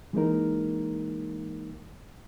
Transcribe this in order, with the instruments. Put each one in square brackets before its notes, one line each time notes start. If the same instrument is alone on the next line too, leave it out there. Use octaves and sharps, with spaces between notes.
[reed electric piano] E3 G#3 A#3 D#4 A#4